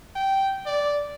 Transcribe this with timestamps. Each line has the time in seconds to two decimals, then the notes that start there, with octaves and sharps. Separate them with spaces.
0.15 G5
0.66 D5